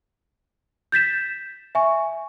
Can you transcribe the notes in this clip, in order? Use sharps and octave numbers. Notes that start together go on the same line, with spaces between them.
G6 A6 B6 E7
E5 G#5 C#6